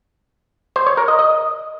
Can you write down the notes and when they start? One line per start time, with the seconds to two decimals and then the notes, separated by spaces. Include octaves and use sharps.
0.76 C5
0.87 C#5
0.97 A#4
1.08 D#5
1.19 D#5